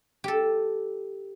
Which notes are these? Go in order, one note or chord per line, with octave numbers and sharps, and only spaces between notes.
G4 A4